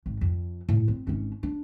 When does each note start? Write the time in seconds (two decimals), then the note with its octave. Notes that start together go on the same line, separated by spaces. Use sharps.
0.06 G#1
0.21 F2
0.69 A2
0.88 C4
1.07 G#1 C#4
1.43 D4